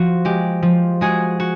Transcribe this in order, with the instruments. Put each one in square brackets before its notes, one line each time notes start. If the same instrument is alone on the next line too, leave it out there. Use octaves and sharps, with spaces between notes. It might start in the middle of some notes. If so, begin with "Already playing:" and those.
Already playing: [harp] F3 F#4
G#3 G4
F3
G#3 F#4 G#4
F#4